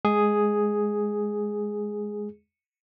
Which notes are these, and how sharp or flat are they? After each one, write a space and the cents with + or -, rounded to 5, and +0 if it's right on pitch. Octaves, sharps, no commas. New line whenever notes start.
G#3 +5 G#4 +0